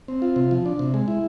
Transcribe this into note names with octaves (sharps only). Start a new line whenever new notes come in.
C4
F4
C3
F3
D4
C3
G#3
E4